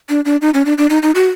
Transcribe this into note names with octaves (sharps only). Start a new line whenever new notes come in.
D4
D4
D#4
C#4
D4
D4
D#4
D#4
F#4